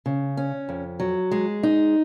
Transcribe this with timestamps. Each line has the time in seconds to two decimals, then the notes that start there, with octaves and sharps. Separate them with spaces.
0.06 C#3
0.37 C#4
0.69 F2
1.00 F#3
1.31 G#3
1.63 D#4